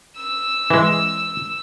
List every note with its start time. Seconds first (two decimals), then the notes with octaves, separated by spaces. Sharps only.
0.16 E6
0.70 E3 G#3